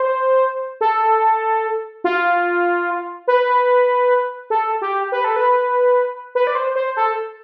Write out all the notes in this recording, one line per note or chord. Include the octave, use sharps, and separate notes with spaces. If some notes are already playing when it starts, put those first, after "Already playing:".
Already playing: C5
A4
F4
B4
A4
G4
B4
A4
B4
B4
D5
C5
C5
A4